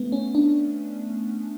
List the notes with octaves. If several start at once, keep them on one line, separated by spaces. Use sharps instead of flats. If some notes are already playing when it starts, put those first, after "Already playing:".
Already playing: A3 B3
C#4
D4